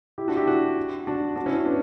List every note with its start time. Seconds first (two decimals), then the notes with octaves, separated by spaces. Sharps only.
0.18 E4 G4
0.28 D4 F#4
0.37 E4 G4
0.47 D4 F#4
1.07 D4 F#4
1.36 D4 F#4
1.46 C#4 E4
1.65 B3 D4